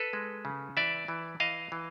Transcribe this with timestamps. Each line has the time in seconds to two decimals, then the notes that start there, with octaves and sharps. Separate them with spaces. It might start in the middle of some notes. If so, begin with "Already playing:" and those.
Already playing: A4 B4
0.13 G#3
0.45 C#3
0.77 E3 D5 E5
1.08 E3
1.40 E3 D#5 F5
1.72 E3